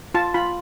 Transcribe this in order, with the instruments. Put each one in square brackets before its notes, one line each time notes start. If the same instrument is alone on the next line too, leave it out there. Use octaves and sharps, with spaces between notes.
[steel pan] F4 A5
F4 B5